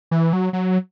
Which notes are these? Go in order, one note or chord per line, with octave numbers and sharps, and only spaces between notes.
E3
F#3
F#3